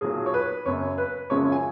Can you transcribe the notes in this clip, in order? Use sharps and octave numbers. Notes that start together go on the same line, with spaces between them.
B1 A#2 F#3 G#4
C#5
B4
F#1 F#2 C#3 C#5
B4
F#1 F#2 C#3 F3 G#3 C#5
G#5